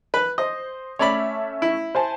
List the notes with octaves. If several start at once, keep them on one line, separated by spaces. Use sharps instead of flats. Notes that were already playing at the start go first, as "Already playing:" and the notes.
B4 B5
C5 D#5
A3 C#4 C#5 D5 E5 B5
E4
C5 G#5 A5